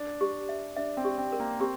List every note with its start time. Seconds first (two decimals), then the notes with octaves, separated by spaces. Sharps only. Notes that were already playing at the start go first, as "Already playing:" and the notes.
Already playing: D4
0.21 G4
0.49 E5
0.76 D4 E5
0.97 C4
1.05 G4
1.18 C4
1.33 A#4
1.40 A#3
1.60 C4 G4